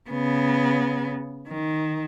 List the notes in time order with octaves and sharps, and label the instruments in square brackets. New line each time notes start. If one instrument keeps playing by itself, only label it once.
[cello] C#3 B3
D#3